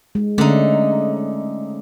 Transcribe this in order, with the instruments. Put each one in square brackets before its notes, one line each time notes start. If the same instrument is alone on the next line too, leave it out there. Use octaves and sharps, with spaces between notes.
[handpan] G#3
[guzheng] D3 D#4 [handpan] A3 C#4